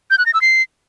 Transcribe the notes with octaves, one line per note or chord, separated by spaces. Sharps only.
G6
F#6
A#6
E6
C7